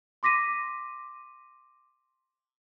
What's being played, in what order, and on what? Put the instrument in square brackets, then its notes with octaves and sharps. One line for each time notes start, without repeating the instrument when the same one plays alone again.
[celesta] C6 D6 A#6 B6 D#7